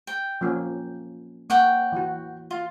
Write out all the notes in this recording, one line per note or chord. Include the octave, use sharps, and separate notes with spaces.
G5
F3 A#3 C#4
A#3 C#5 F#5 G5
E3 F#4
F4